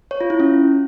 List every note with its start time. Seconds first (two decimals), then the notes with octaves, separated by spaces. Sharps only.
0.11 C#5
0.21 F4
0.30 E4
0.40 C#4